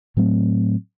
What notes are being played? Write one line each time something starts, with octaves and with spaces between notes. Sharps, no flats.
A2 F#3 A3 C4